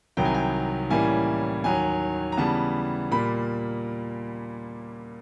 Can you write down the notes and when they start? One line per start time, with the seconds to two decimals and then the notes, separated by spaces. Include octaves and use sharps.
0.17 C2 C3 D#3 F#3 G5
0.25 G#5
0.34 G5
0.90 A2 E3 G3 A#3 C#4 G#5
1.64 D#2 D#3 F#3 G#5
2.32 A#5
2.37 C#3 E3 G3 B3 A5
3.11 A#2 G3 A#3 B5